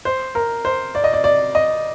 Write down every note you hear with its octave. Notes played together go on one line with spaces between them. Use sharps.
C5
A#4
C5
D5
D#5
D5
D5
D#5